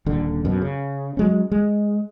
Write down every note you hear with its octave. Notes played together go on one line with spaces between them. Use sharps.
D#1 D3
F#2 B2
C#3
F#3 G#3 C#4
G#3